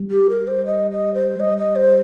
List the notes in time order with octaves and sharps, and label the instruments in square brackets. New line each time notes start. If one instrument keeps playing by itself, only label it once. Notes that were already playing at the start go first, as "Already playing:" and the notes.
Already playing: [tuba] G3
[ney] G4
A#4
C5
D#5
D#5
C5
[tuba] G3 [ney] D#5
[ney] D#5
C5